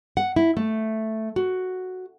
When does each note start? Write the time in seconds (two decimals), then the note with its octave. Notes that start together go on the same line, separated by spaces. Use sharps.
0.17 F#5
0.36 E4
0.57 A3
1.36 F#4